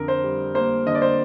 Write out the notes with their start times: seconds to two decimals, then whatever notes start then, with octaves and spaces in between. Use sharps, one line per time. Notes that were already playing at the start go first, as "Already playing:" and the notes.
Already playing: F2 D3 A#4
0.08 C5
0.24 G3
0.55 A#3 C5
0.86 D3 D#5
0.95 D5
1.02 C5